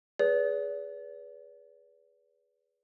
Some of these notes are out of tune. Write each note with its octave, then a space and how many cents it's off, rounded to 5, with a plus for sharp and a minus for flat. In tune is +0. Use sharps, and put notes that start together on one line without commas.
G#4 +0 B4 +0 D5 -40